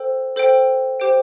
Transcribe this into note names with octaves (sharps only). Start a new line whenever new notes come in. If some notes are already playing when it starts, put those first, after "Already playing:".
Already playing: A4 C5 G5
A4 C5 G5
G4 C5 G5